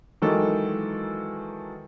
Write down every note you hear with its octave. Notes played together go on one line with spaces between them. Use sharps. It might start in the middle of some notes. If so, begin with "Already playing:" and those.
D#3 E3 F#3 G#3 A#3 A4